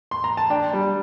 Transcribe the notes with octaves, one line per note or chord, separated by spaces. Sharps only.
C6
A#5
A5
D4 G5
G3